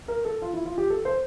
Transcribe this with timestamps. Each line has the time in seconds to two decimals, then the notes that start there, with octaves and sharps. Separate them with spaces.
0.08 A#4
0.25 A4
0.42 F4
0.54 E4
0.65 F4
0.78 G4
0.90 A4
1.05 C5